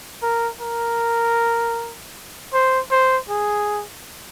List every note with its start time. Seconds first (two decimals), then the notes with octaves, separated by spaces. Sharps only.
0.23 A#4
0.61 A#4
2.53 C5
2.91 C5
3.29 G#4